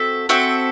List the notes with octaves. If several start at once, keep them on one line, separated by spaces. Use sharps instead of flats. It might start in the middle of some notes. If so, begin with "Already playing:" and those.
Already playing: C4 F#4 A4 E5
C4 F#4 A4 E5